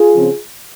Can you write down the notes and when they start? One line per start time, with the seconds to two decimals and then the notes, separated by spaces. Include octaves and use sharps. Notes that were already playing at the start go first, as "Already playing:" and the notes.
Already playing: F4 G#4
0.13 C#3 F3 C4